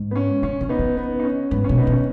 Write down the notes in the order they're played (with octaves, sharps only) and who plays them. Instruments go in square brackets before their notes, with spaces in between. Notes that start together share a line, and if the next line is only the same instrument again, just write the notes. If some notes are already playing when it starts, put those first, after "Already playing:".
Already playing: [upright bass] G#2
[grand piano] B3
C#4
[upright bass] C#3 [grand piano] C#4
[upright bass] C#3 [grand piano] C#4
[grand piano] B3 D#4
[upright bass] C#3
[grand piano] B3
D#4
C#4
[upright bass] G#2 [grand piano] B3
[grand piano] C#4
[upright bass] B2
[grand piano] B3 D#4
[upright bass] B2
[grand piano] C#4